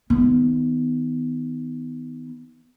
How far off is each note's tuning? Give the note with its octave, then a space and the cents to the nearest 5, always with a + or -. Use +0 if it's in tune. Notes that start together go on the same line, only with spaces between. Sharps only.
D#3 +25 B3 +15